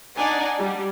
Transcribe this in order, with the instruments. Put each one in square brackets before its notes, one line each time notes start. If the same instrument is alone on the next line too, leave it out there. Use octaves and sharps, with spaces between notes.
[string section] D4 D#4 D5 F#5 G#5
G3